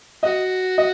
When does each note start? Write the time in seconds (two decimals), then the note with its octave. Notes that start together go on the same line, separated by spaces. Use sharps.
0.23 F#4 D#5
0.78 D#5